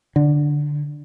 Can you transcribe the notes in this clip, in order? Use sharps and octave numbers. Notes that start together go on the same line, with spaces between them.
D3